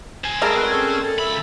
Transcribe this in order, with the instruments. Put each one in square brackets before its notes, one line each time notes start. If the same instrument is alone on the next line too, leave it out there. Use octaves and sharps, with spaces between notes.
[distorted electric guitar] C5 G#5
[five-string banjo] G3 A3 A#4 [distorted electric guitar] C4 [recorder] G#4 [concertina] A5
[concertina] G#3 F#4 B4
C#4 A4 C#5
[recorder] A4 [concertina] G#5
[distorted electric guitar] C#2 B5 [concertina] E5